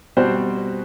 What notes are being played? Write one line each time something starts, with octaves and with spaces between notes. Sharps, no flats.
B2 G3 C4 F#4 C5